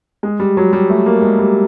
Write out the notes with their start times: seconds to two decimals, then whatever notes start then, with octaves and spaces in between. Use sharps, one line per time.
0.23 G#3
0.40 G3
0.57 F#3
0.73 G3
0.90 A3
1.06 A#3
1.22 G#3
1.39 G3